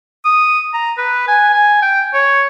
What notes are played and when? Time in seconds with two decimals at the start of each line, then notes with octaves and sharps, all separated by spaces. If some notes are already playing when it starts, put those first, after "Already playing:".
0.25 D#6
0.74 A#5
0.98 B4
1.28 G#5
1.54 G#5
1.82 G5
2.14 C#5